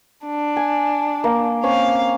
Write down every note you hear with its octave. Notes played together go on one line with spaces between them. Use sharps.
D4
G#5
A#3
C4 C#4 F5